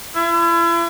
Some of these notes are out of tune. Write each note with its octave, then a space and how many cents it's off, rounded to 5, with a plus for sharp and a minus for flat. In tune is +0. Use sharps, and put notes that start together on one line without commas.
E4 +40